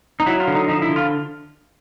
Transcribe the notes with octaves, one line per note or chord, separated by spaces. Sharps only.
D#4
F#3 E4
F4
D3
D#4
F3 D#4
E4
D3
F4